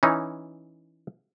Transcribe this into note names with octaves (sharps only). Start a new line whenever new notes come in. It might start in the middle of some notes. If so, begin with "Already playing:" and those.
E3 C#4 D#4